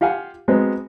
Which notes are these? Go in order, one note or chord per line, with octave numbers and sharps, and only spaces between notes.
F4 G4 F5 F#5 G#5
F#3 G#3 B3 C4